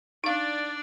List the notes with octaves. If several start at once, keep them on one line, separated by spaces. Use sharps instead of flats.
D4 D#4 D5 F5